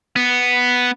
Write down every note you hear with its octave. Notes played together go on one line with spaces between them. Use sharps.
B3